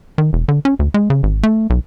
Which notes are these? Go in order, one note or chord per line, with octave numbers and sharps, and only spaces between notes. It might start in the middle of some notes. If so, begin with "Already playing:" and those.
D#3
E1
D3
C#4
D2
G#3
C#3
G#1
A3
B1